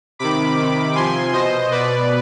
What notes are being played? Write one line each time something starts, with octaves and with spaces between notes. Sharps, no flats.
C3 D#3 B5 D6
C3 D#3
C3 F3 G#5 C6
B2 C5 D#5
B2 B4 D5